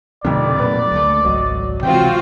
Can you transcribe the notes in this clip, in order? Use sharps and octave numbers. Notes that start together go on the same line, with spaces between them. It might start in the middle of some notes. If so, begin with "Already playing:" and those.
F1 F2 B2 D3 D#3 C4 D5
A#2 F#3 A#3 B4
D2 G#3 A3
G#1 C#2 F#3 D#5
C3 E3 G#3 C4 F4 F#4 G5